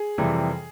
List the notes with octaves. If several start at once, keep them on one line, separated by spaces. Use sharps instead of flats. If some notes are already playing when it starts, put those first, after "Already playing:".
Already playing: G#4
F2 C3 E3 G3